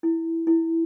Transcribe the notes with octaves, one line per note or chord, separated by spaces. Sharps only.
E4
E4